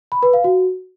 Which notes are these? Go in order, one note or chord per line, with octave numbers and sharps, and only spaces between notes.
B5
B4
F5
F#4